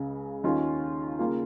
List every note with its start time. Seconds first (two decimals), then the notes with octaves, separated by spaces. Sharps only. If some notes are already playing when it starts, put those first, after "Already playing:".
Already playing: C#2 C#3 G#3
0.44 D#2 D#3 C#4 F4
1.19 C#3 A#3 F4